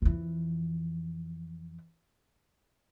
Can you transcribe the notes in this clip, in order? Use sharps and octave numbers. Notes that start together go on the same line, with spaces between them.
F2 E3